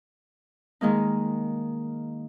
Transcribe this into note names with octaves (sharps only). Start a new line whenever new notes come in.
D#3 G#3 A#3 D#4